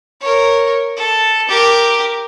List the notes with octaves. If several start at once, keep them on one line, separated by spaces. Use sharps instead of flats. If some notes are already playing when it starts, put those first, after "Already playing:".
A#4 C#5
A4
G4 A#4